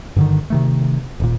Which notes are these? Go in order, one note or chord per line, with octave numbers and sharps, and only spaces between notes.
G2 D3 D#3
C3 D#3 A3
D#1 A#2